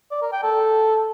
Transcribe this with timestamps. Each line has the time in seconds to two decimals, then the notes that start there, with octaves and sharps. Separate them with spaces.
0.11 D5
0.22 A#4
0.32 G5
0.43 A4